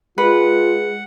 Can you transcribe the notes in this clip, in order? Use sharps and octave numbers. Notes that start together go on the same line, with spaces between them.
G#3 F4 B4 F#5